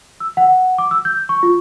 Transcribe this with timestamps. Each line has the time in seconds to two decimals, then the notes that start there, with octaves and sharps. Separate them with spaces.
0.20 E6
0.37 F#5
0.78 D6
0.91 E6
1.05 G6
1.29 C#6
1.43 F4